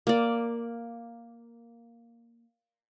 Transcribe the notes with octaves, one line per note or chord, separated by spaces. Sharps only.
A#3 D5